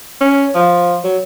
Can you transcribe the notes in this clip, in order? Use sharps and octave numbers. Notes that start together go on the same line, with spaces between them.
C#4
F3
F#3